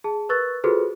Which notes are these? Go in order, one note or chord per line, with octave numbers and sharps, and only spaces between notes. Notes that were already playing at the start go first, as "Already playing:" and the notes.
G#4 A5
A#4 B4 C#6 E6 F#6 A6
F4 F#4 G#4 A4 B4 C5